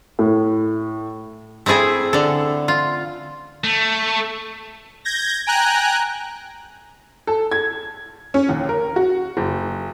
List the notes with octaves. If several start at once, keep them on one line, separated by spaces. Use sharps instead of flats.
A2
A3 C4 E4 G#4 A4
D3 A4
F4
A3
G6 G#6 A#6
G5 G#5 A#5 F#6
A4
G#6
C#4
D#2
A#4
F#4
F#1